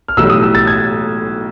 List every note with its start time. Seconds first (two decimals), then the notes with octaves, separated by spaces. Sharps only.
0.08 F6
0.17 B1 A2 E3 G3 E6
0.30 D#6
0.42 E6
0.55 A6
0.67 G#6